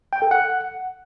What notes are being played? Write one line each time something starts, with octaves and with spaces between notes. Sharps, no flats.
G5
A4
F#5